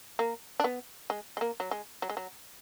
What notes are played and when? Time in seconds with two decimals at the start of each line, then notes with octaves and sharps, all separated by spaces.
0.19 A#3
0.60 D4
0.64 B3
1.10 G#3
1.37 G#3
1.41 A#3
1.60 F#3
1.71 G#3
2.02 F#3
2.10 G#3
2.17 F#3